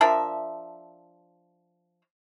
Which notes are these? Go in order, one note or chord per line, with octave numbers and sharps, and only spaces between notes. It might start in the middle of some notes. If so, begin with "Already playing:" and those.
F3 D4 A#4 E5